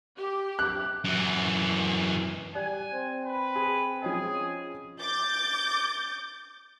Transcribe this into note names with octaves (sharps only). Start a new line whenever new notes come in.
G4
F#6
F#2 E3
G3 G#5 F#6
C4
B4
G#4
F3 C#4 G#4 D#5
D6 G6 A6